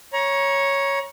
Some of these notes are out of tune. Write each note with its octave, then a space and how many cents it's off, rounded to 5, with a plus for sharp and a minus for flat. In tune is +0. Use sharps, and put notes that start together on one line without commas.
C#5 +0 A#5 +30